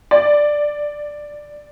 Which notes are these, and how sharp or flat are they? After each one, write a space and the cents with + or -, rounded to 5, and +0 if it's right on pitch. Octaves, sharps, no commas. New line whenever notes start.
D5 +5